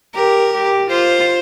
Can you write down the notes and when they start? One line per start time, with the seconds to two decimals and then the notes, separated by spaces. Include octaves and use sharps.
0.14 G4 A#4
0.53 G4
0.89 F4 C5